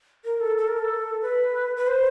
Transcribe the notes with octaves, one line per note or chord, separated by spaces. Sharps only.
A#4
A4
A4
A#4
A4
B4
B4
C5